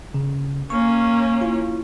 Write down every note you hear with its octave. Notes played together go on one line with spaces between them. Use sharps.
C#3
A#3 C#4 C#6
E4 F4